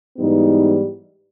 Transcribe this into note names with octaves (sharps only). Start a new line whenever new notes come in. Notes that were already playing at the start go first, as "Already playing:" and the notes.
G#2 E3 G3 B3 D#4